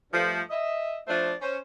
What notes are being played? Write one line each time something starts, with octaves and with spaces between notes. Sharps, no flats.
G2 F3 A3
D#5 E5
F3 A3 D4 E4 C5 D5
C#4 C5